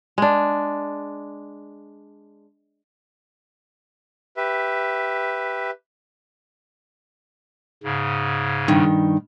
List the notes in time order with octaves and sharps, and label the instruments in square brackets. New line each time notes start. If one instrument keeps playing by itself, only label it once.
[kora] G#3 D4
[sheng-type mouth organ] G4 B4 E5
[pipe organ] G#2 C#3
[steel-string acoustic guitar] G2 D#3